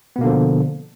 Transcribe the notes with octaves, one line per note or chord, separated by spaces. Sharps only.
B2 D3 F3 A#3 B3